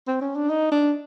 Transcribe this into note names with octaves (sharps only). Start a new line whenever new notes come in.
C4
C#4
D4
D#4
D4